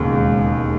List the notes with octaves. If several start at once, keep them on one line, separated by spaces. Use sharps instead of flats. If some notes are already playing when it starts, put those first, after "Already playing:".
Already playing: E1 D#2 C#3 G#3